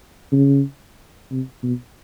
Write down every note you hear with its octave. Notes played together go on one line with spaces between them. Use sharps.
C#3
C3
B2